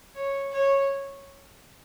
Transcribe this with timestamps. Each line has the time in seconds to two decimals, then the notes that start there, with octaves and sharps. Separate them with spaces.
0.14 C#5
0.51 C#5